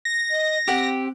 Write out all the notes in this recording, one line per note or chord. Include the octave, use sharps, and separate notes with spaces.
A#6
D#5
C4 G4 F#5